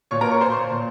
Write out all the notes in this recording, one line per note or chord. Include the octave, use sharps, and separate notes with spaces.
A#2 C#5 C#6
A#4 A#5
C#5 C#6
C5 C6
A#2